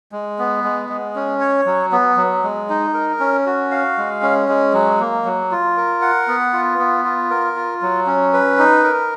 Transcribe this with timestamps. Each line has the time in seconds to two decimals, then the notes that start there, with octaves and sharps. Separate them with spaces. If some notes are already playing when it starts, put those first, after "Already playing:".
0.12 G#3
0.39 B3
0.64 G#3
0.89 G#3
1.16 C#4
1.41 C#5
1.66 F#3
1.92 B3
2.17 F#3
2.43 G#3
2.69 D#4
2.94 A#4
3.20 C#4
3.46 F#4
3.71 F5
3.98 G#3
4.22 C#4
4.49 G#3
4.73 F#3
5.00 A#3
5.25 F#3
5.51 F4
5.77 A#4
6.01 F#5
6.28 B3
6.53 F4
6.79 B3
7.05 F4
7.30 A#4
7.56 F4
7.82 F#3
8.06 C#4
8.33 B4
8.58 D#4
8.84 A#4